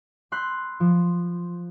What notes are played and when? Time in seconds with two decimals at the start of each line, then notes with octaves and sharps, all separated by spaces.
0.32 B5 C6 E6 F#6 G6
0.80 F3